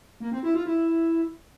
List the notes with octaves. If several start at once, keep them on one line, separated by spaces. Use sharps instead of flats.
A#3
C4
E4
F4
E4